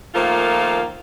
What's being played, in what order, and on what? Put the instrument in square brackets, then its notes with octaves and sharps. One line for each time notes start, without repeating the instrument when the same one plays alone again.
[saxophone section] D#3 F3 A3 A#3 F4